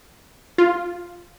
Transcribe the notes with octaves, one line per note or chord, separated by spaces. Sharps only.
F4